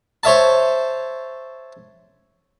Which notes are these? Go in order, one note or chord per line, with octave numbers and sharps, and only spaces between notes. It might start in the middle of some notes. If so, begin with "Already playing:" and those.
C5 C#5 E5 A5